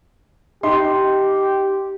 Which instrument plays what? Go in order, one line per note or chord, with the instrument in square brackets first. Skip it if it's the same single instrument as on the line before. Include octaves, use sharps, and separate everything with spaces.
[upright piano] D#4 C6 [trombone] G4